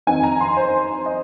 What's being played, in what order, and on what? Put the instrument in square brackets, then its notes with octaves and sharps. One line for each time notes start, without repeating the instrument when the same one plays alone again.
[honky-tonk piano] F2 D#3 C4 D#4 G#5
A#5
C6
C5
D#5